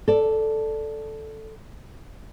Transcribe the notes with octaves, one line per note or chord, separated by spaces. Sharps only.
A4 D5